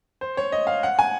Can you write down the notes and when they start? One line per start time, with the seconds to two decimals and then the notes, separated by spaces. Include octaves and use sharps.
0.21 C5
0.37 C#5
0.52 D#5
0.67 F5
0.83 F#5
0.99 G#5